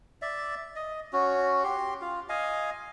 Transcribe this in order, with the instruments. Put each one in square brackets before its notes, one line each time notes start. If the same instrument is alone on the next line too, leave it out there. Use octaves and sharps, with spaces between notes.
[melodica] D5 E5
D#5
C#4 F#4
G4 C6
F4
D#5 F5 G#5